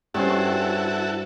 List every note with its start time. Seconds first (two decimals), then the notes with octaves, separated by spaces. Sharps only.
0.14 G2 C#4 E4 F#4 A4 C5